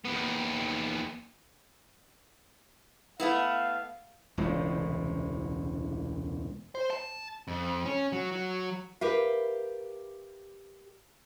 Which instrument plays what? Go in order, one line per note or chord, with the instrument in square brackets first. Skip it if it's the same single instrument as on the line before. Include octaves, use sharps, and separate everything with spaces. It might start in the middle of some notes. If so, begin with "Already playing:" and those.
[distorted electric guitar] D#2 B3
[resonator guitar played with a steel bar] A3 B3 E4 [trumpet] F5
[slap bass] E1 C#2 A2 C3
[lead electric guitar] C5
A5
F2
C#4
F#3
F#3
[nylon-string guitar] G4 A#4 B4 E5 F5